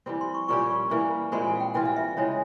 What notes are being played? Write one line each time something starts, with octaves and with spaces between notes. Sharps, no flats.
E3 G3 C4
C6
C#6
A#2 G3 C#4 G4 C#6
C#6
E3 G3 A#3 E4
A#2 G#3 C4 E4 C6
G#5
F5
G5
E3 G3 C4 F4 G5
F5
E5
C#3 E3 G#3 C#5